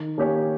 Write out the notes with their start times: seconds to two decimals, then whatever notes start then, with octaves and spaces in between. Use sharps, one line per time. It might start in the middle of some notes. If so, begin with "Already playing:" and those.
Already playing: D#3
0.18 A#3 C#4 G4 C#5